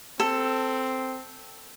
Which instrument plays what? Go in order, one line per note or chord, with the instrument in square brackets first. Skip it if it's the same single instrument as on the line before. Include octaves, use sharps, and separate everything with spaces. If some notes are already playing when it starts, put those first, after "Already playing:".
[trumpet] C4 [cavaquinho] A4